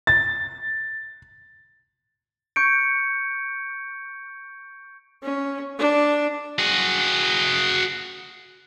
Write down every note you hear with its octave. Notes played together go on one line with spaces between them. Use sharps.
A6
C#6 G6 C#7 D7
C#4
D4
F#4 G#4